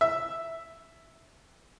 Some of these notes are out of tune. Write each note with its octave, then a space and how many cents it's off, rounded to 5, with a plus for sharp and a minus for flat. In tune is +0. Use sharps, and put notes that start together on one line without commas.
E5 +5